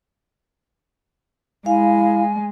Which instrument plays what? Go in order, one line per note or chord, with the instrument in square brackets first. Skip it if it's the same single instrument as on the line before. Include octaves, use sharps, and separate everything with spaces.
[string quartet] G#3 [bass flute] E4 [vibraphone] F5 [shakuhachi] G#5